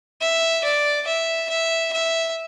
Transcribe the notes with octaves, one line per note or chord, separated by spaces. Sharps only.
E5
D5
E5
E5
E5